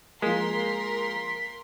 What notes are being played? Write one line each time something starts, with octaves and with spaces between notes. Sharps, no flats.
F3 G#3 A#3 A#4 C6 B6